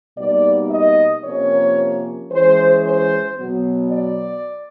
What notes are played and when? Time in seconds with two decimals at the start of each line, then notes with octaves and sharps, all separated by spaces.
0.16 B2 G3 A#3 D#4 D5
0.70 D#5
1.23 C3 F3 A#3 C#4 C#5
2.30 E3 G#3 C#4 C5
2.83 C5
3.37 B2 F#3 B3
3.90 D5